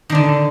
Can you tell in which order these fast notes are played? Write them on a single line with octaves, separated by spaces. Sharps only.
D#3 D4 D3